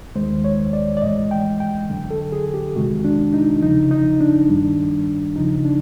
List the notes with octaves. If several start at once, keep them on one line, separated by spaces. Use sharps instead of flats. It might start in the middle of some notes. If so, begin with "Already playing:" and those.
D#2 D#3 G#3 C5
C#5
D5
D5
A2 E3 G#3 D#5
G5
G5
F2 D3 F#3
A4
G#4
G4
F2 C3 D#3 G#3 F#4
D4
D#4
E2 C#3 F3 D#4
D#4
D4
G2 D#3 G3
E2 C#3 F3 D#4
D4